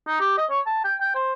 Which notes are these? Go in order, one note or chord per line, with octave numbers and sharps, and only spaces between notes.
D#4
G4
D#5
C#5
A5
G5
G5
C5